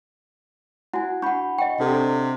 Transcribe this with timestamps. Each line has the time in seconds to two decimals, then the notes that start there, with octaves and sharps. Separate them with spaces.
0.94 E4 F#4 F#5 G#5
1.22 D4 F#5 B5 C#6
1.58 D#5 F#5 G5 C#6
1.80 C3 D4 A4